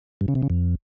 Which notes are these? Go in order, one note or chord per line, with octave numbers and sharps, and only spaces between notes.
G2
C#3
C3
C#3
F2